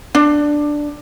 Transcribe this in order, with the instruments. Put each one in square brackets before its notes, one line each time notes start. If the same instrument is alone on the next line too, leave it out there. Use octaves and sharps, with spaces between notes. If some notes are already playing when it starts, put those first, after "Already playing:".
[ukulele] D4